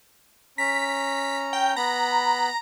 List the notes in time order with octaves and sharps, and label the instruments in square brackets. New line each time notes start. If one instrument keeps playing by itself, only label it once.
[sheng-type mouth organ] C#4 A#5 [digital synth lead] B6
[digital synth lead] G5
[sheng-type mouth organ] B3 B5 [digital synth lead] A#5